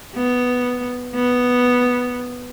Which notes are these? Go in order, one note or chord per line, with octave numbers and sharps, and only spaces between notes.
B3
B3